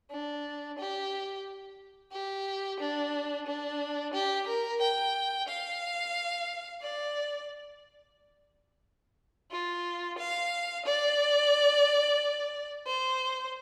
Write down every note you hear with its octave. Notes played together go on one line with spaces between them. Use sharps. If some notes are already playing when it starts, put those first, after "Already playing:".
D4
G4
G4
D4
D4
G4
A#4
G5
F5
D5
F4
F5
D5
C5